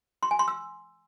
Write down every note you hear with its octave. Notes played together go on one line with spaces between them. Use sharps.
C6
G#5
C6
E6